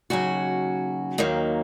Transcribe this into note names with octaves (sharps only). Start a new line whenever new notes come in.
D#2 C#3 F#3 F#4
D#2 D#3 F#3 A#3